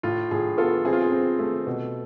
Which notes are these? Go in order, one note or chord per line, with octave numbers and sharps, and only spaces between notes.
A2 F4
A2 G#4
B3 F4 A4
C4 G#4
F4
G#4
C4
A3
B2